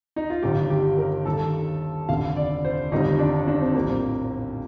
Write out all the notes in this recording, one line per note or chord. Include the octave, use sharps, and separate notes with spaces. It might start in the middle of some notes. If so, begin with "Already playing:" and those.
D#4
F4
G1 G2 D#3 G3 G4
G4
A#4
D#2 D#3 G3 A4
F1 D#2 D3 F5
D5
C5
G1 F2 D#3 G3 D#4
D4
D4
C4
A#1 A2 G3 A#3
C4